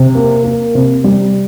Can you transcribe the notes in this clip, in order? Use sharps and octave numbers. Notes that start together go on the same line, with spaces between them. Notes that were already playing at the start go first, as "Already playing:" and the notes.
Already playing: C3
A#3
A#3
C3
G3